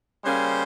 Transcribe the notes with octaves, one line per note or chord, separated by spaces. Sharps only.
C#3 G3 A#3 C#4 C5